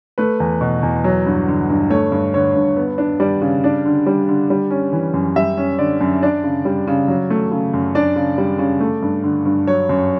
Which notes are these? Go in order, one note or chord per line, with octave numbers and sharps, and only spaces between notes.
A3 B4
E2
B2
E2
F#3
G2
D3
G2
A3 C#5
G2
D3 C#5
G2
B3
D4
G3 D5
C#3
D4 D5
D3
G3
D3
G3
C#4
E3
F#2
G3 E5
C#4
D3 D5
F#2
D4 D5
C#3
G3
C#3
F#3
A3
C#3
F#2
D4 D5
C#3
G3
C#3
A3
G2
D3
G2
F#3 C#5
F#2